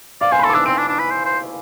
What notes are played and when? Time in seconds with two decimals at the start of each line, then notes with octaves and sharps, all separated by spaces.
0.21 D5 F5
0.32 C5 G#5
0.39 B5
0.43 A4 C6
0.50 D6
0.54 D4 E6
0.66 C4 D7
0.77 D4
0.88 D4
0.99 B4
1.11 C5
1.25 C5